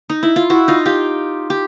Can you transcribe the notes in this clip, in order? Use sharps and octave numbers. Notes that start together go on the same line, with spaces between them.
D#4
E4
F4
E4 F#4
D#4 F4
F4 G4
G4